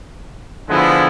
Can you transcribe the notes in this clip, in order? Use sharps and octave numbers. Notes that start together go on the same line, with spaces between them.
D3 F3 G#3 B3 E4